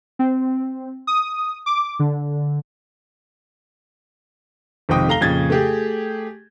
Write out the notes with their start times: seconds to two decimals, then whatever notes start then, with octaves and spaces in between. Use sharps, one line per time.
0.19 C4
1.07 D#6
1.66 D6
1.99 D3
4.89 G#1 F2 C3 D#4 G5 D#6
5.08 A3 F5 A#5 A#6 G7
5.21 F2 A#2 C#3 G#6 A6
5.50 A3 G4 G#4